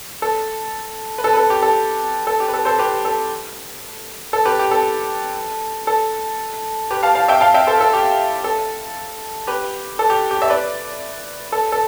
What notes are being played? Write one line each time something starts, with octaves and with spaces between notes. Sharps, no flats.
A4
B4
A4
B4
A4
G4
A4
A4
G4
B4
A4
A4 C5
G4 B4
A4
A4
G4 B4
G4
A4
A4
G4 B4
F5 A5
F5 A5
E5 G5
F5 A5
E5 G5
A4 C5
A4
G4
A4
G4 B4
A4
G4
G4
E5
B4 D5
A4
A4